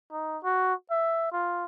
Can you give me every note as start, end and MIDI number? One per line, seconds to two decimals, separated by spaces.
0.12 0.38 63
0.44 0.74 66
0.91 1.29 76
1.32 1.65 65